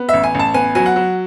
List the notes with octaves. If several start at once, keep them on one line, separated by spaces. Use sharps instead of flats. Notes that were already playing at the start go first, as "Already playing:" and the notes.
Already playing: B3
A1 E5
G#5
A1 A5
B3 G#5
F#3 G#5
F#5
F#3